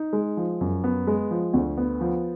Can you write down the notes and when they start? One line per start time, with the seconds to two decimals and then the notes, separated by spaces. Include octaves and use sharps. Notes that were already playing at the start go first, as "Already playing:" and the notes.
Already playing: D#4
0.13 G#3
0.37 F3
0.61 F#2
0.84 B3
1.07 G#3
1.31 F3
1.54 D2
1.77 B3
2.01 F3